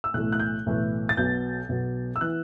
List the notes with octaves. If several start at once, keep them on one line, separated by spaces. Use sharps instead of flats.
E6
B1 A2 E3 A3 F#6
F#6
G6
B1 A2 E3 A3
A6
B1 B2 F#3 B3 G6
B1 B2 F#3 B3
E6
E3 B3 E4 F#6